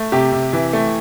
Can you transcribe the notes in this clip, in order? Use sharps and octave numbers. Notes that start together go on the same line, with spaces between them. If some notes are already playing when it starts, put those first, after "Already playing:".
Already playing: A3
C3 G4
C3
E3
A3